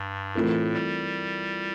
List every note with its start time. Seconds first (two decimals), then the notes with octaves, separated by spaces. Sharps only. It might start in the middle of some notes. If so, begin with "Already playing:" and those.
Already playing: G2
0.35 A2 E3 A3 C4 F4 A#4
0.74 G3